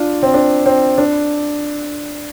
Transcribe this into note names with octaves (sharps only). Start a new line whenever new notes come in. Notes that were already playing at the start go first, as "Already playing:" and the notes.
Already playing: D4 F4
C4
D4
C4
D4